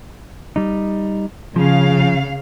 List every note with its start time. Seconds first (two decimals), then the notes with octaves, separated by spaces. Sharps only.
0.56 G3 D#4
1.56 C#3 F3 F5